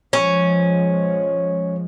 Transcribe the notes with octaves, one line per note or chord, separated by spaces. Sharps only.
F3 G#3 C#4